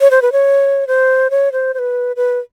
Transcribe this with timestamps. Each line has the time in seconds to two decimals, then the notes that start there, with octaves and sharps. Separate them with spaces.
0.01 C#5
0.11 C5
0.22 B4
0.32 C#5
0.87 C5
1.30 C#5
1.52 C5
1.74 C5
1.79 B4
2.16 B4